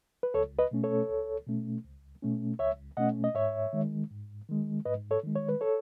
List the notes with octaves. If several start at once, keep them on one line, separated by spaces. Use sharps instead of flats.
B4
C#2 A4 C#5
B4 D#5
B2 A3 C#4
A4 C#5
C#2
B2 A3 C#4
C#2
B2 A3 C#4
C#2 C#5 E5
B2 A3 C#4 D#5 F#5
D#5
G#2 C#5 E5
D#3 G#3
G#2
D#3 G#3
G#2 B4 D#5
A4 C#5
D#3 G#3
C#5
B4
A4 C#5